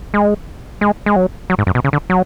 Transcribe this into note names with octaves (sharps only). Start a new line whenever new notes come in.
G#3
G#3
G#3
F#3
F#3
G#2
F#2
B2
C#3
D3
F#3